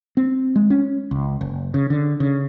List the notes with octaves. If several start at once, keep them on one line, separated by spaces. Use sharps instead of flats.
C4
G#3
C#4
C#2
F#1
C#3
D3
C#3